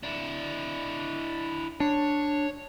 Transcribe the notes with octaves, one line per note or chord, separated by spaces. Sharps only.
D4 E4
D4 C#5